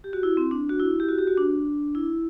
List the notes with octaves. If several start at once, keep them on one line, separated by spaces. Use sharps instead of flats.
G4
F#4
E4
C4
D4
F#4
E4
G4
F#4
G4
F#4
D4
E4